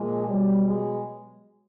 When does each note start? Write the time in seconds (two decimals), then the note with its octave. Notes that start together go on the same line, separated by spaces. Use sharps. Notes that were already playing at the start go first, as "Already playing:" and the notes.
Already playing: A#2 F3 G#3
0.26 B2 F#3 G3
0.64 G#3